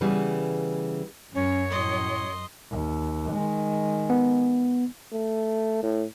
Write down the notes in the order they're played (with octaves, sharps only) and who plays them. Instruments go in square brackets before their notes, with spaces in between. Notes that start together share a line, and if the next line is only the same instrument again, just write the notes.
[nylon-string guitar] C#3 E3 G3 B3 G#4
[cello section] F#2 [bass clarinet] C#4 [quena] C#5
[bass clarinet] A2 [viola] D#5 C6
[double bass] D#2
D#3 G#3
[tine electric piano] B3
[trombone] A3
A2